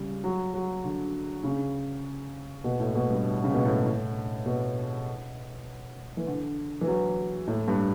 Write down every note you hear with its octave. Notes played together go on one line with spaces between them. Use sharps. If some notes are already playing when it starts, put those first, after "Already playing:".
Already playing: C#3 G3
F#3
F#3
D3
C#3
B2
A2
B2
G2
C#3
B2
A2
A2
B2
E3
D3
E3
F#3
A2
G2